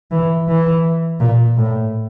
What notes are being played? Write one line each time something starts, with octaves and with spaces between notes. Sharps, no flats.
E3
E3
A#2
A2